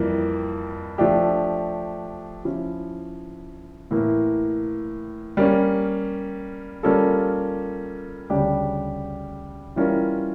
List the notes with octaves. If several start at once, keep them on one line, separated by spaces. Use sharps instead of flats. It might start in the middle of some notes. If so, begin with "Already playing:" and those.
Already playing: F2 E3 G3 A#3
F3 A3 D4 G4
F3 C#4 E4
A2 E3 A#3
G3 A#3 C#4
G3 A#3 C#4 F4 A4
D2 C#3 G3 D4 G4
E3 G3 C#4 F4 A#4